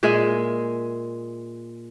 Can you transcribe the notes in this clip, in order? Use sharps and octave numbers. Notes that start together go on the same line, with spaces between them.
A#2 G#3 G#4 E5